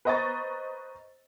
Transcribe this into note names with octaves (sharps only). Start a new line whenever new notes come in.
B4 C5 D#5 A#5 C#6 A6